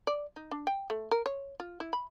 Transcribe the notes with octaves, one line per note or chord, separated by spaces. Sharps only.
D5
D#4
D4
G5
A3
A#4
C#5
F4
E4
B5